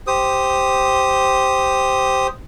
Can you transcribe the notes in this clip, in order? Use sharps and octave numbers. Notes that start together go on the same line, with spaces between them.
G4 C5 D#6